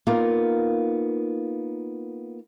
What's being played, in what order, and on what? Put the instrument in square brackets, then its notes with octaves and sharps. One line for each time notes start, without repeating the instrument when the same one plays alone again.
[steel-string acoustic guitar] A#3 B3 D#4 F4 A#4